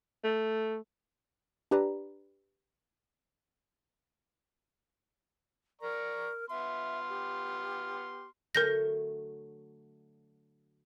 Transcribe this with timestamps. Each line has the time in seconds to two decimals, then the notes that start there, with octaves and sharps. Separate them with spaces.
0.24 A3
1.71 D4 G4 B4 D5 A#5
5.81 A#4 D5 A#5 C#6
6.50 B3 E5 C6 F6
7.09 G4
8.55 D3 F#3 A3 A#4 G6 A#6